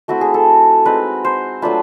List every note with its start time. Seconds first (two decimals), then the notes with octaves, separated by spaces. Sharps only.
0.08 A3 C4 E4 F#4
0.21 G#4
0.34 A4
0.85 G#3 C4 D#4 B4
1.25 C5
1.62 F#3 A3 D4 F4 B4